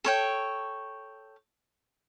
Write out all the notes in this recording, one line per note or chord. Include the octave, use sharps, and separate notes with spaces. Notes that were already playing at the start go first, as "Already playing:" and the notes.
A4 C#5 G5